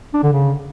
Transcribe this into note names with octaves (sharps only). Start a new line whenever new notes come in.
D4
D3
C#3